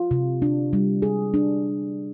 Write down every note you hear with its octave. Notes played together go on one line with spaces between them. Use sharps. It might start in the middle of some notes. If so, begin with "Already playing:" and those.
Already playing: F4
C3
D4
G3
G#4
D4